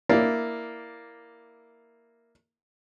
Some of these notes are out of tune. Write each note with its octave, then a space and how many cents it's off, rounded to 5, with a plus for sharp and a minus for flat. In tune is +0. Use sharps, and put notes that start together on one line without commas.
A#3 +0 E4 +0 D5 +0